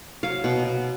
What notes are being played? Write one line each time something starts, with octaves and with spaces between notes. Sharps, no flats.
F#3 F5
B2
B2